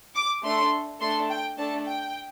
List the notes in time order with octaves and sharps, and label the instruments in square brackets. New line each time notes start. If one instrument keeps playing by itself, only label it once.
[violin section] D6
A3 D4 A4 C6
A3 D4 A4 C6
G5
A3 D4 A4 A5
G5